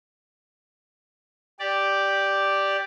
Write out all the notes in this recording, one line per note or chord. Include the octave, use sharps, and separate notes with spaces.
G4 D5